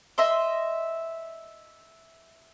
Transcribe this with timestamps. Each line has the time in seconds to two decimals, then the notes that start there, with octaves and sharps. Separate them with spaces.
0.18 D#5 E5 B5 C6